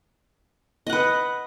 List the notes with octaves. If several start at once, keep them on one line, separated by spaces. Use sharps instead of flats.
B4 D#5 F#5